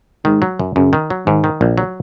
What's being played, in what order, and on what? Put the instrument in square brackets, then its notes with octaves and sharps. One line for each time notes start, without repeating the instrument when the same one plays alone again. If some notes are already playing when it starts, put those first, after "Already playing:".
[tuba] G#2 [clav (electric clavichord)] D#3
[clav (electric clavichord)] F#3
F#2
[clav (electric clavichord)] F#2 [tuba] C#3
[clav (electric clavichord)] D#3
F#3
[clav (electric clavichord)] G#2 [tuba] D#3
[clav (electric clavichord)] D#3
A#1
F#3